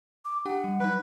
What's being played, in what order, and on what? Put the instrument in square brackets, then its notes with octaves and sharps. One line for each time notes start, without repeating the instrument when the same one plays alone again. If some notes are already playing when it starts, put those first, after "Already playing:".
[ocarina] D6
[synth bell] D4 G4 G5 [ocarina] F#5
[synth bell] G3
[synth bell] F#3 D#4 [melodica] B4